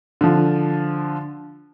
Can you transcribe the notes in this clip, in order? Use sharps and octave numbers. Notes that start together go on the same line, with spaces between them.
D3 F3